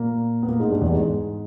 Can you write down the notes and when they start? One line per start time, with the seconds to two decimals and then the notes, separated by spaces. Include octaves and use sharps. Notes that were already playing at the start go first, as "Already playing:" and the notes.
Already playing: A#2 A#3
0.43 B3
0.48 A#2 A#3
0.59 G#2 G#3
0.70 G2 G3
0.81 E2 E3
0.93 G#2 G#3